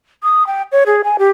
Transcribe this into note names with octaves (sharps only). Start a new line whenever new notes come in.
D#6
G5
C#5
G#4
G#5
G4